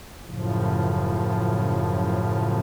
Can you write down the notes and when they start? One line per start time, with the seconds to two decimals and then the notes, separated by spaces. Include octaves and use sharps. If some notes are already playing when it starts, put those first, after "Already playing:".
0.24 F#2 A2 C#3 F3